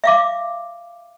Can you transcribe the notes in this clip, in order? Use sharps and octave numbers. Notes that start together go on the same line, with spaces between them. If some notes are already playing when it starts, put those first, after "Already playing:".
E5 F5 D6